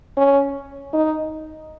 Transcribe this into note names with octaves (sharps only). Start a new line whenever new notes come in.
C#4
D#4